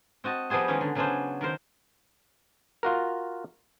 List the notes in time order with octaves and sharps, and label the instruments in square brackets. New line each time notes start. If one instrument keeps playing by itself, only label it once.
[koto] C4 F#4 D#5 A5
F3 G3 B3 G#4 C5
D#3 E3 G#3 C#4
D3
C#3 F#3 B3 C#4 D4 C5
D#3 A#4 C5
[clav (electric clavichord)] F4 F#4 A#4